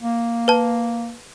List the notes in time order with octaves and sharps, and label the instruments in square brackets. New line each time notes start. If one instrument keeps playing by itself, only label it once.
[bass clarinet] A#3
[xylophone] B4 A5